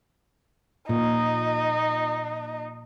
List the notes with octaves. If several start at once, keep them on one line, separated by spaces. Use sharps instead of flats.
A#2 D#4